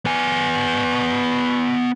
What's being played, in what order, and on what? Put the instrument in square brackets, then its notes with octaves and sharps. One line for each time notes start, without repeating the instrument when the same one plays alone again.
[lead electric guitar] B3 G#5